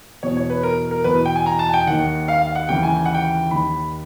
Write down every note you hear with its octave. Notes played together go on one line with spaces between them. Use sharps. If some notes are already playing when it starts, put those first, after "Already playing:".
E2 B2 C#5
C#5
B4
A#4
A#4
E2 B2 B4
G5
G#5
A#5
A5
G#5
G5
D#2 D#3 F#5
F5
F5
F#5
D#2 C#3 E3 G5
G#5
G5
F#5
G5
D#2 D#3 B5